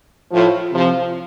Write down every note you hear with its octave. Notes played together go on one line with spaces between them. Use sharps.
A2 F3
C3 F3